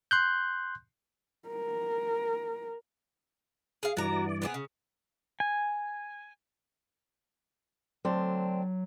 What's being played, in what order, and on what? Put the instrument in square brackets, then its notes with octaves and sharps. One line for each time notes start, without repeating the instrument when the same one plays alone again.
[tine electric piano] C6 F#6 G6
[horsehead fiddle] A#4
[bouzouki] G#4 F5
[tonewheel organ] G2 E3 D5 [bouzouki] F#4 A#5
[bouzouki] B3 C4 G#4
C#3
[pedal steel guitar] G#5
[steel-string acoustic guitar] D2 C4 D4 [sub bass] F#3